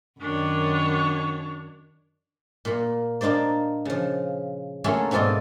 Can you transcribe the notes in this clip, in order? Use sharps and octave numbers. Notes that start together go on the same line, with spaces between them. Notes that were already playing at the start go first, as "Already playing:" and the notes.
F#2 D#3 D4 C#5
A#2 A#3
A#3 D4 D#4 C5 D5
C#3 F3
A3 A#3 C#4 F4 F#4 G#4
G#2 B2 C4 F4 D5 D#5